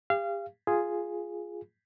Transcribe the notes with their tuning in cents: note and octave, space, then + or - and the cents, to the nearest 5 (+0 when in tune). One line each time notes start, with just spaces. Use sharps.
G4 +40 F5 -25
F4 +0 G#4 +0